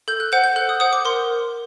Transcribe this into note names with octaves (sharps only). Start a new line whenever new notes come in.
A4 G6
F#6
C5 F#5 G6
G6
A4 F#6
D#6
C5 F#5 D#6
D6
A#4 C6